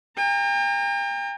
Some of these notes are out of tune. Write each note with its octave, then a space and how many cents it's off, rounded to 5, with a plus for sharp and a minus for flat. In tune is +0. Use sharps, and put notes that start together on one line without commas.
G5 +40 A#5 -25